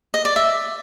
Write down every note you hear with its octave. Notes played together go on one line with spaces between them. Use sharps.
D#5
D5
E5